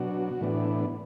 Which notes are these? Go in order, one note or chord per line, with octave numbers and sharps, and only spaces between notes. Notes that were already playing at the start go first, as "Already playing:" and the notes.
Already playing: B2 F#3 D4 F#4
A2 E3 B3 D4